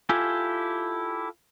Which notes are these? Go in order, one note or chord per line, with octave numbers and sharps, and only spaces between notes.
E4 F4 G4 A4 G#5